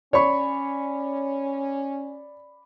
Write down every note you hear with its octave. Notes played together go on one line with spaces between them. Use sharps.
C#4 C#5 D5 B5 C#6